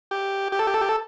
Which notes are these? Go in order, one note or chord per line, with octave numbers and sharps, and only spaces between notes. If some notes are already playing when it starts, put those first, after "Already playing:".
G4
G4
A4
G4
A4
G4
A4